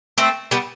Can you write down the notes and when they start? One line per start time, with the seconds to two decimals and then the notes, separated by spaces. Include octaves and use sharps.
0.18 A3 C4
0.51 G3 B3